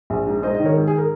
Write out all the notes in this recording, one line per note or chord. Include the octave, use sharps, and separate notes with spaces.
A#1
G#2
G#2 C5 D#5
D#5
D#3
A#4 C#5
G#2
G#4
A#4